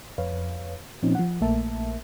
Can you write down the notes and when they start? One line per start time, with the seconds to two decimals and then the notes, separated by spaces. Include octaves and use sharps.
0.18 F2 B4 C#5 F5
1.03 A#2 F3 C4 C#4 D#4
1.15 F3 F#5
1.41 A#1 A3 A#3 A#4 E5 A5